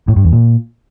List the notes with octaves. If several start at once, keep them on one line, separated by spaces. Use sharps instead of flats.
A2
G2
E2
A#2